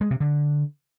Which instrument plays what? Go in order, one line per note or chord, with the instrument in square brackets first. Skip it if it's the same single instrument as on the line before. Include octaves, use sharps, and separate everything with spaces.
[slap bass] G#3
C3
D3